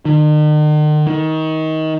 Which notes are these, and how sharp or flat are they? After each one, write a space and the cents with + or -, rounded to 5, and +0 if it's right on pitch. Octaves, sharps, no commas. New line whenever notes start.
D#3 -45
D#3 +25